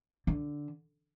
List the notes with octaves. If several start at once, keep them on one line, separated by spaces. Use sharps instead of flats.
D3